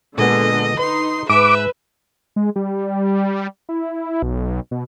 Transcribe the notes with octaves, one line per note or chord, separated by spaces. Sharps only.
A#2 D3 G#3 B3 D#5
D#4 B4 C6
G#2 B4 E5 D6
G#3
G3
E4
B1
B2